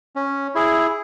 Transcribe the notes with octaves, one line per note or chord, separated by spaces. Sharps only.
C#4
E4 G#4